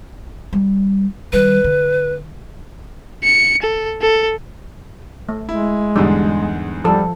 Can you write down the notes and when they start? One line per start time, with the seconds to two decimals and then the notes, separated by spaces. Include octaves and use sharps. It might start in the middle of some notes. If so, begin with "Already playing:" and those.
0.53 G3
1.33 D#3 G3 B4
1.64 D3
3.23 C#7
3.62 A4
4.01 A4
5.29 A3
5.49 G#3 E4
5.96 E2 G#2 D3 G3
6.84 F3 G3 A4